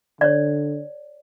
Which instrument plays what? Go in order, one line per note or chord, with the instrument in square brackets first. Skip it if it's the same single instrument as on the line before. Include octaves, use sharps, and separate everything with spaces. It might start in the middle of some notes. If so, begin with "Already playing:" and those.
[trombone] D3 [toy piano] C#5 D5